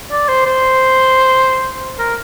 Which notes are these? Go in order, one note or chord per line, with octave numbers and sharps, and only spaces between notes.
D5
C5
C5
A#4